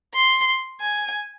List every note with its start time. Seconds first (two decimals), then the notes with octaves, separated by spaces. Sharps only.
0.14 C6
0.81 G#5